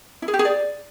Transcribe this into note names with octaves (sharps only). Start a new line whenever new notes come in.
E4
G#4
G4
G#4
D5